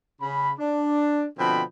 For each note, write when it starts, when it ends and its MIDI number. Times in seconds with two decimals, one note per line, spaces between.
0.20 0.51 49
0.20 0.51 83
0.59 1.25 62
1.37 1.62 47
1.37 1.62 50
1.37 1.62 53
1.37 1.62 60
1.37 1.62 79
1.37 1.62 83